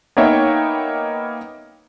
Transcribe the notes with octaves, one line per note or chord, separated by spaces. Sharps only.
A#3 B3 D#4 C#5 E5 G5